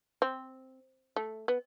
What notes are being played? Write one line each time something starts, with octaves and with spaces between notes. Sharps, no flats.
C4
A3
B3